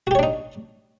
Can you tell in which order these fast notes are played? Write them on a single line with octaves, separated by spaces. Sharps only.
F#4 G4 C#5 D4 D#4